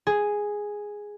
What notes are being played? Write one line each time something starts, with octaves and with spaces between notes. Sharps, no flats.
G#4